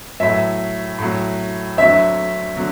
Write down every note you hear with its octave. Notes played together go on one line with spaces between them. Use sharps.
A2 F#3 E5
A2 F#3
D2 D3 F#3 E5
D3 F#3